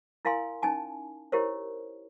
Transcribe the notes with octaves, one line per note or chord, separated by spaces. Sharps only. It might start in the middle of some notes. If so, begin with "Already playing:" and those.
E4 A#4 F5 G#5 C6
C#4 D#4 G#5 A5
E4 G4 A#4 C5 C#5